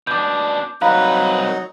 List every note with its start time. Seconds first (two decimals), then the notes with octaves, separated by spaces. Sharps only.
0.07 B2 D4 D6 G6
0.82 C2 F#3 D#4 B4 F5 A#5 B5